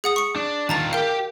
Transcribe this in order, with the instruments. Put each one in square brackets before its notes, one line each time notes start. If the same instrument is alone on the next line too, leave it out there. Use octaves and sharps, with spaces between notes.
[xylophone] G#4 F#5 D#6
C#6 C#7
[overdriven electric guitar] D4
[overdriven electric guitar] D#3 F4 [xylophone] A5 A#5 A6
[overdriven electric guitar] G4 G5 [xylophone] A#4 F5